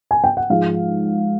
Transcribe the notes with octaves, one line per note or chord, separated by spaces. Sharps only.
G#5
G5
F#5
G#2 F3 G#3 F5